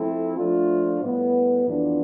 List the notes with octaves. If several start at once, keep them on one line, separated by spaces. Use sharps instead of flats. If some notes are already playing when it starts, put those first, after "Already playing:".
Already playing: F3 A3 C4 E4 A4
F3 A3 D4 F4
A2 G3 B3
F2 E3 B3 D4 F4